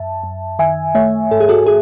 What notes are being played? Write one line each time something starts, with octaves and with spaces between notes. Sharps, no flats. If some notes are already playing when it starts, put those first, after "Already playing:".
Already playing: F#2 E5 A5
F#2
D#3 E5 G#5
A3 C#5 E5
G#2 A4
G#4
F#4 A4
G#4